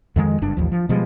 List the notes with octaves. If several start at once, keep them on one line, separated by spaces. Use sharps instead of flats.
F2 D#3 G#3
F#1 G2 D4
A1 D#2 F3
F3
B2 F3 G3 G#3